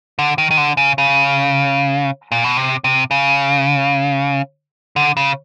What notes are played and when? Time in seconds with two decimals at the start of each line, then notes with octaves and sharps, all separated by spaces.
0.19 D3
0.38 D#3
0.51 D#3
0.57 D3
0.77 C#3
0.98 C#3
2.32 A#2
2.44 B2
2.57 C3
2.84 C3
3.11 C#3
4.96 D3
5.17 C#3